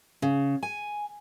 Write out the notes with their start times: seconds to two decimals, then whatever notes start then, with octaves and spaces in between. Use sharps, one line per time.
0.22 C#3
0.63 G#5